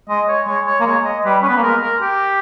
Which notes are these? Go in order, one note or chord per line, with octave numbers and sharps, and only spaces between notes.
G#3 D#5
C#5
G#3 C#5
C#5
A#3
G#3 C#5
D#5
G3 B4
C#4 B4
B3
A#3
G#3 A#4
A#4
G4